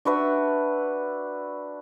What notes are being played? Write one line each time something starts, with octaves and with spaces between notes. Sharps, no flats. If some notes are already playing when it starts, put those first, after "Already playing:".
D4 F#4 B4 E5